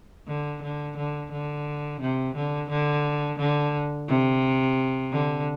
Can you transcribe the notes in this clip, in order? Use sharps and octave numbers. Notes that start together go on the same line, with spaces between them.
D3
D3
D3
D3
C3
D3
D3
D3
C3
D3